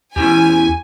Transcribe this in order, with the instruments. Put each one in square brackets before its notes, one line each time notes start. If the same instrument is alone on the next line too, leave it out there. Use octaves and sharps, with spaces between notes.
[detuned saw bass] E2 [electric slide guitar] C#4 E4 G4 [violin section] G#5